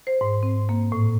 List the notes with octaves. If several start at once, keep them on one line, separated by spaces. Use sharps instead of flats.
C5
G#2
C4
A#3
A2